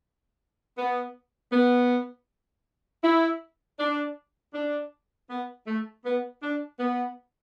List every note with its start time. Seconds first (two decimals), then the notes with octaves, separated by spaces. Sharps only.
0.78 B3
1.53 B3
3.04 E4
3.80 D4
4.54 D4
5.30 B3
5.67 A3
6.05 B3
6.43 D4
6.79 B3